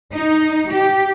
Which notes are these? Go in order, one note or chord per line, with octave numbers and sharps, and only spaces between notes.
D#4
G4